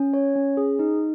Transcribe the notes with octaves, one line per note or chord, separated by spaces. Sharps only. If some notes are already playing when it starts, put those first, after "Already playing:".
Already playing: C#4
C#5
C#4
G#4
D#4